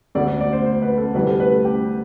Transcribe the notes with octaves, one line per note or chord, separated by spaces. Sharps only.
E1 D2 D3 D5
D5
D5
C5
C5
B4
A4
D2 C3 E3 G3 B4
A4
B4
A4
G4